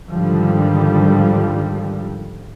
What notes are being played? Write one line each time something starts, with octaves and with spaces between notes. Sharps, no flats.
G#2 D3 D#3 F3 G3